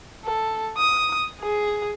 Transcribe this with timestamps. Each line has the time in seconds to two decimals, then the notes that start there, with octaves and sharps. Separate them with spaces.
0.24 A4
0.78 D#6
1.40 G#4